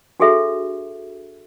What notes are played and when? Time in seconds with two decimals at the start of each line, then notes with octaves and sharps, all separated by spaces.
0.20 D4 F#4 G#4 A4 E5